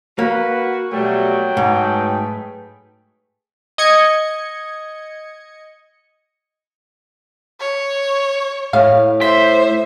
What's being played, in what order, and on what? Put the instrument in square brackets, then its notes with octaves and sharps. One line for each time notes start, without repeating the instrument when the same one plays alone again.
[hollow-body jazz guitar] A#3 [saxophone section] F#4 [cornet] B4
[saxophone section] B2 G3 A3 [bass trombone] F#3 [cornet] G5
[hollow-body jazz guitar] G#2 [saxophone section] A3 G#4 B4
[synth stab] D#5 G#6 C#7
[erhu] C#5
[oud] A2 E4 [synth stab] F5
[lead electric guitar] C5 [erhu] E5 [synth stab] B6